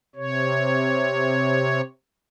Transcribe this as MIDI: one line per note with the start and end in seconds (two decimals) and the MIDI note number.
0.16 1.81 48
0.16 1.81 73